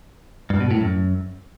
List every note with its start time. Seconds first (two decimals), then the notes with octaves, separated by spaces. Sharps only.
0.50 G2
0.60 B2
0.71 A2
0.81 F#2